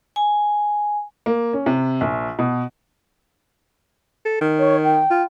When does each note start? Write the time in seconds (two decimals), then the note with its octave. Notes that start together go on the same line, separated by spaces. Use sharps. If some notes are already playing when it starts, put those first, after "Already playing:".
0.16 G#5
1.26 A#3
1.53 C#4
1.66 C3
2.01 A#1
2.39 B2
4.25 A4
4.41 D#3
4.58 C#5
4.83 G5
5.10 F4